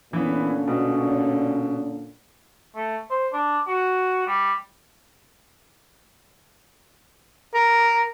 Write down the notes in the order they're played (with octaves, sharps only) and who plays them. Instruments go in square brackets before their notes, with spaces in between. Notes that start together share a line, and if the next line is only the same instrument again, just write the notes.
[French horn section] A#2 D3 C#4 [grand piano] E3 B3
[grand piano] B2
[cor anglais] A3
C5
D4
F#4
G3
[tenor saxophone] A#4